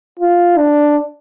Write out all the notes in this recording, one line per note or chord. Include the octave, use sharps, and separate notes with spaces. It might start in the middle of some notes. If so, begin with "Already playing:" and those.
F4
D4